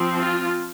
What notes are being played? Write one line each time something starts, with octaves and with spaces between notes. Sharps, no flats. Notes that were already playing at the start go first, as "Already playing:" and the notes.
Already playing: F3 C4
F4